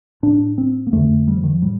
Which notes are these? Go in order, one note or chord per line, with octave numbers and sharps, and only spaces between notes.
A2 D4
C4
A#3
F2 D3 A3
G3
F3
D#3
F3
A2 G3